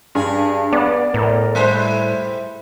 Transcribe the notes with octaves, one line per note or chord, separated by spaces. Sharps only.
G2 G#4
B3 D5
A2 A#4
G3 E4 B4 C5